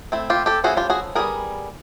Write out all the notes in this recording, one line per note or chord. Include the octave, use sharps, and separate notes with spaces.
A3 C4 E4
F4 G4
G4 A4
F3 A3 C#4 E4 F#4 G#4
F4 G4
F#4 G#4
G3 B3 D#4 G#4 A#4